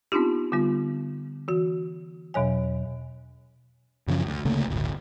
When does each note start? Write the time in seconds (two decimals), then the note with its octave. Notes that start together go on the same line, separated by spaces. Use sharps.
0.12 B3 C4 D4 D#4 F4 G4
0.52 D3 G3 B3 F4
1.48 E3 F#4
2.34 E2 B2 F#3 C#5 G#5
4.08 F#2 C#3 F3 C#4
4.26 D2
4.45 D2 C#3 A3 A#3
4.68 D1 G1